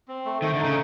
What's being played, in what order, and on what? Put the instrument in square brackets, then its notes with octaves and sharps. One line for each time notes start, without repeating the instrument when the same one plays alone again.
[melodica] C4
A3
[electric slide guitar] D#3 [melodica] A3
[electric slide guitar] D3
[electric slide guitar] C#3 [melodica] D#4